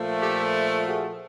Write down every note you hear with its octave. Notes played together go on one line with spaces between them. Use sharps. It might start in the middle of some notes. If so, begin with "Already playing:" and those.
Already playing: A#2 F3 A3
G4 A4
F#4 G#4